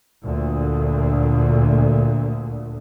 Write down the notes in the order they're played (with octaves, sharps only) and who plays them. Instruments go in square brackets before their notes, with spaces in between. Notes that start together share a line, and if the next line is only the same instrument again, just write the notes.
[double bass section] D2 A#2